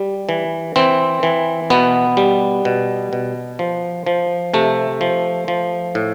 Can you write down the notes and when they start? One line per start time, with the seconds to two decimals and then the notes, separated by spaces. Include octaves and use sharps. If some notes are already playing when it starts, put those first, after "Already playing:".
Already playing: G3
0.29 E3
0.76 E3 C4
1.23 E3
1.70 B2 B3
2.17 G3
2.65 B2
3.13 B2
3.59 F3
4.07 F3
4.54 C3 A3
5.01 F3
5.48 F3
5.95 A2